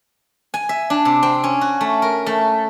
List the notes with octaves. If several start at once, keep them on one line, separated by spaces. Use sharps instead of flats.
G#5
E5
D4
C3
C4
C#4
F#4
A3
A#4
A3